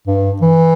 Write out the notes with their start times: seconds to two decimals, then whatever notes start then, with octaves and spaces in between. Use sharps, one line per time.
0.07 G2
0.42 E3